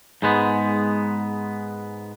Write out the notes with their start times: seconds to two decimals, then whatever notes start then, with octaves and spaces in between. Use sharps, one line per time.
0.22 G#2 G#3 B3